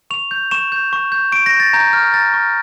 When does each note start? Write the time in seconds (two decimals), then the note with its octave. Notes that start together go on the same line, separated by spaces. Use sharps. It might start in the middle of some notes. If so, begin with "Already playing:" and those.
0.10 C#6 F7
0.31 G6
0.51 C#6 E7
0.72 G6
0.93 C#6
1.12 G6
1.32 C#6 D7
1.46 A#6
1.52 G6
1.60 A6
1.73 A#5 G6
1.93 C#6 F6
2.13 A#5 A6
2.34 C#6 F6